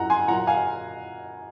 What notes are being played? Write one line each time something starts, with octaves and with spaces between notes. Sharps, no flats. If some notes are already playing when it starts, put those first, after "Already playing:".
Already playing: F#2 F3 F#5 A#5
G#5 C6
A#2 F#3 F#5 A#5
F5 G#5